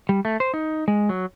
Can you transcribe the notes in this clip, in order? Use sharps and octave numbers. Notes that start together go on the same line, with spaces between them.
G3
A3
C5
D#4
G#3
F#3